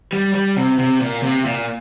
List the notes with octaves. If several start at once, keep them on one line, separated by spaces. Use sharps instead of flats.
G3
G3
C3
C3
A#2
C3
A#2